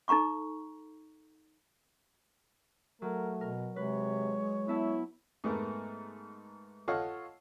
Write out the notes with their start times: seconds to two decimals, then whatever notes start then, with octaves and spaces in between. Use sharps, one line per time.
0.08 D#4 A4 A#5 C#6 D6
3.02 F#3 A3 A#4
3.41 B2 A#4
3.76 C3 G#3 B4 C#5
4.68 B3 E4 E5 A5
5.44 G#2 A3 B3 A#4
6.88 F4 A4 C#5 D#5 F5 F#5